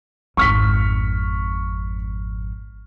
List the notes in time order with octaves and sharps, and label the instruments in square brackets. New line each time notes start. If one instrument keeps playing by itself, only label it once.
[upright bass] G#1 F2 [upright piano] C#6 F6 B6